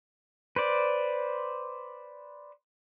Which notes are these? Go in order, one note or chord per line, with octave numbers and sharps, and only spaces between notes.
B4 C5 D5